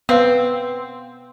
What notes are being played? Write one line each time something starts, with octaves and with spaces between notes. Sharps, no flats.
B3 C4 B4 F5 E6